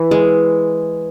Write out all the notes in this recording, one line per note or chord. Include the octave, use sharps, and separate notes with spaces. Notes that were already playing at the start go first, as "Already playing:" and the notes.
Already playing: E3
G#3